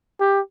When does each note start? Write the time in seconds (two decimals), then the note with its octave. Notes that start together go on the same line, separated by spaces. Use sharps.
0.20 G4